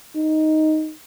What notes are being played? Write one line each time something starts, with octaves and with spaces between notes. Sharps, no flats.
D#4